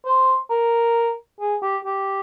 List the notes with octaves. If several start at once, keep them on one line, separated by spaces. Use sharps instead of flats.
C5
A#4
G#4
G4
G4